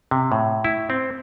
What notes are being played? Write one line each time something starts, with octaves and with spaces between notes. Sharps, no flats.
C3
A2
E4
C4